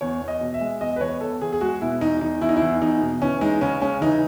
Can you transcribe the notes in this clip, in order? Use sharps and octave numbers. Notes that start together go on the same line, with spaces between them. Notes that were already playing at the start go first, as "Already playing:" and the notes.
E2 C#5
E2
D#5
B2
E5
G#3
E2 D#5
B4
E2 C#5
E2 A4
E2 G#4
G#4
G#3 F#4
B2 E4
E2 D#4
E2 D#4
E2 E4
D#4
E4
E2
E2 D#4
B2
E3 C#4
G#3 D#4
C#3 C#4
G#3 C#4
E3 D#4